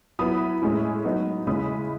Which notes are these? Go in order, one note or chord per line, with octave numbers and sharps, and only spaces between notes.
F#3 B3 E4 B5 D#6
A2 G#3 C#4 E4
F#3 B3 D#4
C#3 G#3 C#4 E4 B5 D#6